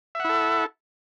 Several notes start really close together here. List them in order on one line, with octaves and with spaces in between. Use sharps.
E5 F#5 E4 A4